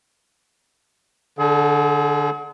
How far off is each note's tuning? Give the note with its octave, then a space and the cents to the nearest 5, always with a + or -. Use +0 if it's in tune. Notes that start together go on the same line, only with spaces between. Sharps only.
D3 +0 G#4 +40